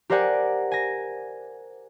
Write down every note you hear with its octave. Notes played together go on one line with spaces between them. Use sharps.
G4 A#4 C5 D5 F#5 G#5
G#5 A#6